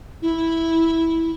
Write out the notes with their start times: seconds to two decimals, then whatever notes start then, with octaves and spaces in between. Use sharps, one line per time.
0.22 E4